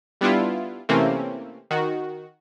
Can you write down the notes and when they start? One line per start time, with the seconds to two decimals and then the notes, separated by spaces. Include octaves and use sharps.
0.21 G3 B3 D4 E4 F4
0.89 C3 E3 A3 A#3 C4 C#4
1.71 D#3 F#4